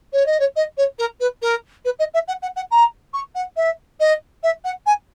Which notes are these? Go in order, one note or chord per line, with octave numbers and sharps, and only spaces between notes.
C#5
D#5
C#5
D#5
C#5
A#4
B4
A#4
B4
D#5
E5
F#5
F#5
F#5
A#5
C#6
F#5
E5
D#5
E5
F#5
G#5